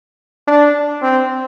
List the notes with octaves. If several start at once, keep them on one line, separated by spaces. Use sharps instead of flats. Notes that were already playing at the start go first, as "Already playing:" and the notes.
D4
C4